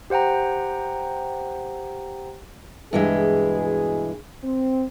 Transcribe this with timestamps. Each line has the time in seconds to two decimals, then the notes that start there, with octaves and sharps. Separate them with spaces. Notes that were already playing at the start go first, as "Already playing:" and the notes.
0.10 G4 C5 F#5 G5 A#5
2.93 G2 B2 E3 G#3 G#4
4.44 C4